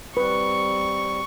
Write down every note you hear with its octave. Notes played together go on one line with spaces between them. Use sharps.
G3 C4 B4 C#6